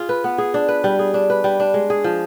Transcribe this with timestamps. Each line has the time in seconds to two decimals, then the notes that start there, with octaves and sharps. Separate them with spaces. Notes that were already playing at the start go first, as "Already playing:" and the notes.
Already playing: F4 G#4
0.09 B4
0.24 B3
0.38 G#4
0.54 D4
0.68 B4
0.84 G3
0.99 G#4
1.14 D4
1.30 B4
1.44 G3
1.60 D4
1.74 G#3
1.90 G#4
2.04 F3